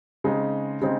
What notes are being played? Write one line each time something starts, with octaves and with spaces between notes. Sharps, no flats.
C#3 G#3 C4 D#4
C#3 G#3 C4 D#4